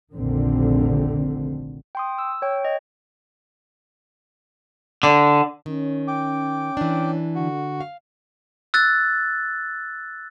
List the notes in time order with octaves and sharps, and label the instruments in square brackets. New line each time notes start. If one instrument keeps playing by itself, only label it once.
[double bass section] F1 A#1 D3 D#3 C4
[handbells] G5 C6 D#6
E6
C#5 G5
D#5
[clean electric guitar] D3
[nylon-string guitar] D#3 [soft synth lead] C#4
[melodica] G5 D6
[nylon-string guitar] E3 D4
[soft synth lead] D3 [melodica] F#4
[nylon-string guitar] F5
[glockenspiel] E6 F#6 A6